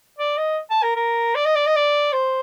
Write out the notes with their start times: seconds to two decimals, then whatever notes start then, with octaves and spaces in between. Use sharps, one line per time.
0.19 D5
0.38 D#5
0.71 A5
0.83 A#4
0.96 A#4
1.35 D5
1.45 D#5
1.56 D5
1.67 D#5
1.76 D5
2.13 C5